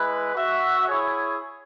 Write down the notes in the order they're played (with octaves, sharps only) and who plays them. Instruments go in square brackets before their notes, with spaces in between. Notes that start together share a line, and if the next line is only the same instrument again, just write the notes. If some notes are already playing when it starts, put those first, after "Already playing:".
Already playing: [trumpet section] G#3 E4 B4
F#4 E5
E4 G#4 C#5